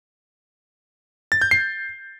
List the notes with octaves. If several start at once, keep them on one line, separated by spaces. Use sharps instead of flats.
A6
G6
C7